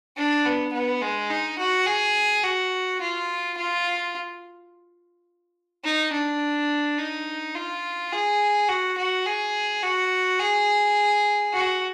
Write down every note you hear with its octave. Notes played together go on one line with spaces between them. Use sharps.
D4
B3
B3
G#3
D#4
F#4
G#4
F#4
F4
F4
D#4
D4
D#4
F4
G#4
F#4
F#4
G#4
F#4
G#4
F#4